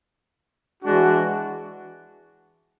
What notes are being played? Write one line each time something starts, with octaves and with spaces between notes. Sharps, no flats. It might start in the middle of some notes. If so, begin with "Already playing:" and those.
E3 G#3 D4 F#4